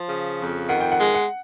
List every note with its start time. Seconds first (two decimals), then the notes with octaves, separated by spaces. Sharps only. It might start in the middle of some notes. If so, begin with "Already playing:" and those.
Already playing: F3
0.09 C#3
0.39 F2
0.69 D#3 F#5
0.81 G5
0.92 F#5
1.00 G#3
1.14 F#5